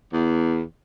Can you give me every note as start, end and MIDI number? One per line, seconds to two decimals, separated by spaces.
0.12 0.62 40